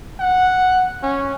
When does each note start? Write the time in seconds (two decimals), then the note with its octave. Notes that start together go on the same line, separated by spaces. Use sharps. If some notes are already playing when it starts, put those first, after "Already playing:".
0.20 F#5
1.03 C#4